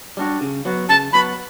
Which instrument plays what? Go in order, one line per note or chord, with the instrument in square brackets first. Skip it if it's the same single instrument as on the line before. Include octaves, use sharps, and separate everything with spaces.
[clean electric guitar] G3 D4 F#4
C#3
F#3 B3 F#4
[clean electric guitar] C#3 [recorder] A5
[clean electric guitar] F#3 B3 F#4 [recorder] B5